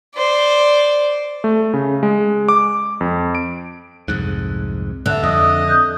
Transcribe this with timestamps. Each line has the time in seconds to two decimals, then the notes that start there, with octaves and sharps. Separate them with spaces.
0.16 C5 D5
1.44 A3
1.74 C#3
2.03 G#3
2.49 D6
3.01 F2
3.35 D7
4.08 C2 F2 G#2 F#6
5.06 D3 E5 F#6
5.23 F2 D#5
5.68 D#6 F#6 G6